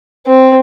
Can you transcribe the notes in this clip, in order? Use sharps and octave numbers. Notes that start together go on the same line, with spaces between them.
C4